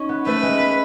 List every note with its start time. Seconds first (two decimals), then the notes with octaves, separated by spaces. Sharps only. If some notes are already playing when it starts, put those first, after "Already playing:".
Already playing: C#4 D#4
0.09 B3
0.26 A3 B4
0.43 G#3
0.59 B3